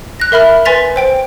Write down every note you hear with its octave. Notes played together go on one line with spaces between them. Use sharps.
F#6 A#6
A#4 E5 B5 F6
B4 G#5 C6 A6 B6 F7
C5 G5 D7